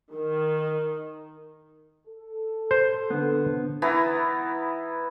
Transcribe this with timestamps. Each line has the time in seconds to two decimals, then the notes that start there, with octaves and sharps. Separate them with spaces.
0.15 D#3
2.08 A4
2.71 C5
3.10 D3 B3
3.82 E3 B3 E4 A#5